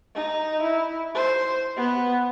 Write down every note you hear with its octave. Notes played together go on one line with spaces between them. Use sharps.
D#4
E4
C5
B3